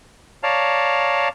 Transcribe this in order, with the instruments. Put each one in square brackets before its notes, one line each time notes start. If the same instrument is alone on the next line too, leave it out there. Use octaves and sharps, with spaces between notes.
[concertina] C#5 D5 F5 A5 A#5